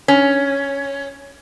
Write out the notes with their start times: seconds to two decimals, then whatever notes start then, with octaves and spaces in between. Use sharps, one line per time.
0.08 C#4